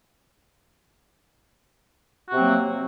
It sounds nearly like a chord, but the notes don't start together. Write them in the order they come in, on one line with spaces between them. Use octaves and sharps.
F#4 C3 C4 F#3 A#3